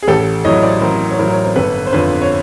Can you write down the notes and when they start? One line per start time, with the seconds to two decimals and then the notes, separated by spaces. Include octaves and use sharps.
0.03 G#4
0.08 A1 G4 A4
0.45 A2 F#3 C#5 D#5
0.63 C5 D5
0.81 A1 A#4 C5
1.11 C#5
1.19 A2 F#3 A#4 C5
1.33 C#5
1.44 C5
1.56 G1 A4 B4
1.87 C5
1.93 F2 D3 B4 C#5
2.22 C#5